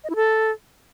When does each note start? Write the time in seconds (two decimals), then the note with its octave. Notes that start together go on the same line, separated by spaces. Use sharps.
0.04 D#5
0.10 E4
0.16 A4